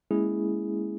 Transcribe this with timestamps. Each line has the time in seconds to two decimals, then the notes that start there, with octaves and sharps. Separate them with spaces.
0.11 G#3 A#3 C#4 E4 G#4